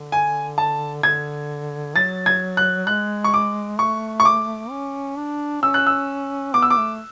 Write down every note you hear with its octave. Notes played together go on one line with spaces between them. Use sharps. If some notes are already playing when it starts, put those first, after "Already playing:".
Already playing: D3
G#5
A5
D3 G#6
F#3 A6
G#6
F#6
G#3 F#6
C#6
D6
A3 C#6
C#6
D6
C#4
D4
C#4 E6
F#6
E6
B3 D6
E6
D6
A3